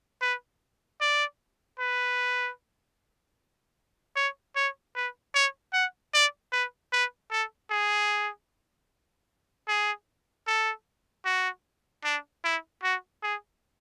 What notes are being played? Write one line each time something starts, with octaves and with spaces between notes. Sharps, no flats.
B4
D5
B4
C#5
C#5
B4
C#5
F#5
D5
B4
B4
A4
G#4
G#4
A4
F#4
D4
E4
F#4
G#4